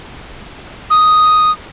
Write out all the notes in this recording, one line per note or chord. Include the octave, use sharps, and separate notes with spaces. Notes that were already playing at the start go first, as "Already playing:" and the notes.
D#6